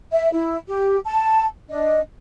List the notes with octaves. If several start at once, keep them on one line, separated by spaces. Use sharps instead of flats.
E5
E4
G4
A5
D4 D#5